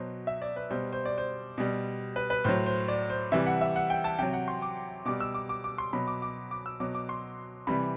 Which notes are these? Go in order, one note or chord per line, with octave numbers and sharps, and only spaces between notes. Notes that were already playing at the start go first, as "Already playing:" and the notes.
Already playing: B2 F#3 C5
E5
D5
B4
B2 G3 C5
C5
D5
C5
B2 G3
B4
B4
A2 F#3 C5
C5
D5
C5
C3 E3 G3 E5
F#5
E5
F#5
G5
A5
C3 F#3 G5
F#5
C6
D6
B2 G3 D6
E6
D6
D6
D6
C6
B2 F#3 B5
D6
D6
D6
E6
B2 F#3 D6
D6
C6
C3 E3 G3 B5